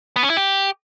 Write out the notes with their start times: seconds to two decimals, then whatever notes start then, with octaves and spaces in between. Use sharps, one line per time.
0.16 B3
0.23 C#4
0.30 E4
0.37 G4